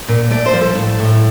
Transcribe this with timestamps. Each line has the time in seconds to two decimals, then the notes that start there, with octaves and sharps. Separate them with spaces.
0.08 A#2
0.31 A3 D5
0.46 C5
0.53 F3
0.61 A4
0.75 A2
0.98 A2